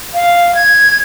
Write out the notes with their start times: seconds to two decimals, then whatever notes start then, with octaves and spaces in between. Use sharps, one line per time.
0.14 F5
0.55 G#6